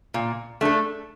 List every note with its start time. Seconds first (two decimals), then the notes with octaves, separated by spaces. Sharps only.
0.14 A#2
0.61 A3 D4 A4